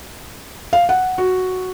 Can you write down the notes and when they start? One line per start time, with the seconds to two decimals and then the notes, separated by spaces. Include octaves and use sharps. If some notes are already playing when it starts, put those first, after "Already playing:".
0.73 F5
0.89 F#5
1.18 F#4